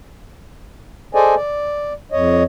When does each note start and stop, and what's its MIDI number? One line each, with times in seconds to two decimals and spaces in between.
1.15 1.35 68
1.15 1.35 69
1.15 1.35 72
1.15 1.35 74
1.15 1.35 75
1.15 1.35 80
1.35 1.93 74
2.12 2.43 41
2.12 2.43 73
2.12 2.43 75